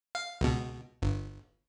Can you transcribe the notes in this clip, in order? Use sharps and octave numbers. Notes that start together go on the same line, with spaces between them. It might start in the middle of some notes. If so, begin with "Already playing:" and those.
F5
C#2 B2
G1